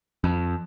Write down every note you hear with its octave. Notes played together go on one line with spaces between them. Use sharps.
F2